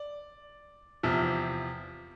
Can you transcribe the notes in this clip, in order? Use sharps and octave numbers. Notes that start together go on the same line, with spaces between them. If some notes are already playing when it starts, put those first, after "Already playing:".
Already playing: D5
E2 C3 F3